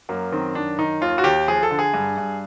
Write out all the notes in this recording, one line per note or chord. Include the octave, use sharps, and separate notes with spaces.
F#2 A#3
D#3 C4
F#2 D4
D#3 D#4
D#2 F4
F#4
D#2 G4
F3 G#4
A4
D3
G#4
G2
G2